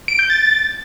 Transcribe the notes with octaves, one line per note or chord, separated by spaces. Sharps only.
D7
G6
A6